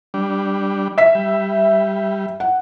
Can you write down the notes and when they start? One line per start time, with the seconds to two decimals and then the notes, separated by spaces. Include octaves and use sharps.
0.14 G3 D4
0.98 E5 B6
1.15 G3
2.40 F#5